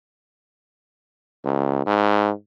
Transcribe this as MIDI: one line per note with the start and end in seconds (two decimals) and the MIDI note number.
1.45 1.82 37
1.86 2.31 44